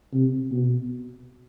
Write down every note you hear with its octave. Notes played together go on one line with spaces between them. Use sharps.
C3
B2